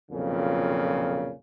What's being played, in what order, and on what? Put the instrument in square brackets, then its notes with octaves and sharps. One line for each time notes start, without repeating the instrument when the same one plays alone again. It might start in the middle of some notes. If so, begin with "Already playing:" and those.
[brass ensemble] B1 F2 A#2 C#3